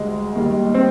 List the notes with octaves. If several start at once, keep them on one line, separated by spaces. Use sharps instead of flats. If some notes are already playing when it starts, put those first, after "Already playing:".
Already playing: D2 D3 G3 G#3
D#2 D#3 G3
C4